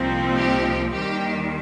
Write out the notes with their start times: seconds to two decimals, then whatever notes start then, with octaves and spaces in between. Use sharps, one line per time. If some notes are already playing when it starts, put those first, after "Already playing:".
Already playing: C2 A#2 F3 C4 D#4
0.37 G4
0.93 D#2 D#3 G3 G4